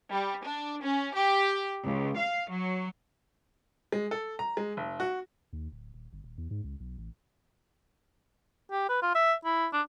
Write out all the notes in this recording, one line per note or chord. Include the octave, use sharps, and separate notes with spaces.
G3
D4
C#4
G4
C#2
F5
F#3
G#3
A4
A#5
G#3
F1
F#4
D#2
D1
D#1
G1
D#1
E2
G#2
C#2
B1
A1
G4
B4
F4
E5
E4
D4